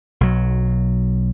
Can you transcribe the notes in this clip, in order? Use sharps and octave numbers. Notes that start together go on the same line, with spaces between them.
B1 F#3